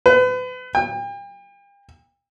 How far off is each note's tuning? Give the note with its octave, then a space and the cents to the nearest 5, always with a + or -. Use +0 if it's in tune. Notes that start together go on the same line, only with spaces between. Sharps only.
B4 +35
G5 +40